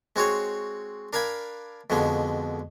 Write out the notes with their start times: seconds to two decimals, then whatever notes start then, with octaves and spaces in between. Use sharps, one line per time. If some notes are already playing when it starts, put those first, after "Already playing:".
0.16 G#3 C4 F#4 G#4 C#5
1.13 D4 A#4 F5 G#5 B5
1.90 F2 B2 D3 G#3